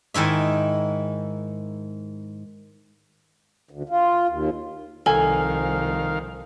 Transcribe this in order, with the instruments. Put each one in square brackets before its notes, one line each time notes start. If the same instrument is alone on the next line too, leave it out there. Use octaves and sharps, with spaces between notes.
[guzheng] G#2 D#3 E4 E5
[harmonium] D2
F4
D#2
[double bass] C2 F3 [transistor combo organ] D#3 F5 [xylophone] A4 [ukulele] G#5